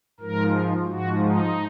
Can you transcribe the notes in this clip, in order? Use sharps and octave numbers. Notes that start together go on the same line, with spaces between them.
G#2 F3 A#4
G#2 F3 F#4
D#4